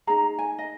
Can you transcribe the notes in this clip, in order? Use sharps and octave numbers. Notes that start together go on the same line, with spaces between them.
D#4 G#4 A#5
G#5
D#5